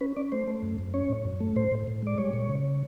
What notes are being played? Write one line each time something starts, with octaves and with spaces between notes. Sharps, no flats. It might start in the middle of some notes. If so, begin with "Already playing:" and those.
C#4 B4
C#4 D5
A3 C5
A3
F#2
F#2
C#4 C#5
A2
F#2
A3
A2 C5
A2
A2
G#3 D5
G3 C#5
A#2
C#3